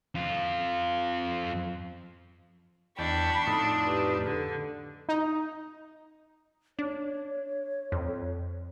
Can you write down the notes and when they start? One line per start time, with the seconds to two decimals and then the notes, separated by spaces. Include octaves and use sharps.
0.15 F2 F4
2.99 E2 D4 G5 A5 B5 C#6
3.47 F2 A2 D#4
3.84 G4 B4
4.25 D3
5.09 D#4
6.79 D4 C#5
7.92 F2